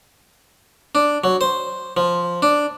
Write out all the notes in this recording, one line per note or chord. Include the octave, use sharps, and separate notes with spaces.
D4
F#3
C5
F3
D4